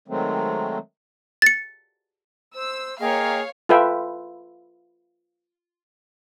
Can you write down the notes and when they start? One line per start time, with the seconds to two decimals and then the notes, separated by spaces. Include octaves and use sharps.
0.08 D#3 F#3 G#3 A3 C4
1.42 A6 C#7
2.55 C5 E6
3.00 A#3 G#4 C#5 D#5 F5 G5
3.69 F4 A4 B4 E5 G5